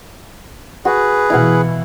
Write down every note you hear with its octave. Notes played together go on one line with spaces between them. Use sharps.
F#4 G#4 B4
B2 E3 E4 F5 F#5